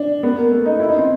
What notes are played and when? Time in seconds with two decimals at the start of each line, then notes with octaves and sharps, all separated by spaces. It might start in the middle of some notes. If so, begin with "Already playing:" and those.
Already playing: D4
0.23 B3
0.37 A#3
0.51 A3
0.66 D#4
0.79 E4
0.89 D#4
0.98 C4